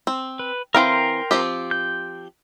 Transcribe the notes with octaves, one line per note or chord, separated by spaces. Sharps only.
C4
B4
E3 C4 A#4 F5 G5 C6
F3 C4 G4
G6